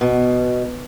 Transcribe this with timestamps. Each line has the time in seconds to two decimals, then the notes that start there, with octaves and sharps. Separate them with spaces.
0.01 B2